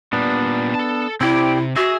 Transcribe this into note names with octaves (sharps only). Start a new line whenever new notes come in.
A#2 G3 B3 D4
A4 A5
C3 C4 E4 G4 D5
F#4 G#4 E5